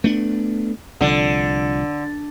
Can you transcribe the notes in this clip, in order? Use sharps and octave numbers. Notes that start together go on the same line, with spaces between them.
A3 B3 D4
C2 D3 F3